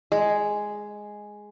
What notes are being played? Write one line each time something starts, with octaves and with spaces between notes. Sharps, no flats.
G#3